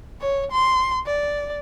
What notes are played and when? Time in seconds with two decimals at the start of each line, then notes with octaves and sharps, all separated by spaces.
0.21 C#5
0.52 C6
1.06 D5